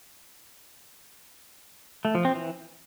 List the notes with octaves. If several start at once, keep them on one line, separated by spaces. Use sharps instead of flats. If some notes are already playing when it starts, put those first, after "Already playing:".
A3
F3
C4
E3